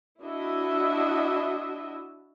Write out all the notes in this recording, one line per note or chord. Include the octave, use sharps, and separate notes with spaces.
D4 E4 F#4 D#5 E5